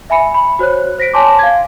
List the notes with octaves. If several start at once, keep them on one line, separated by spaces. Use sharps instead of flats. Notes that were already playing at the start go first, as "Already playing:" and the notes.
E5 G#5 B5 C#7
B5
F#4 C5 C#5 F#6
C5 A#6 B6 D7
C#5 G#5 A5 C6 D6
F5 G#6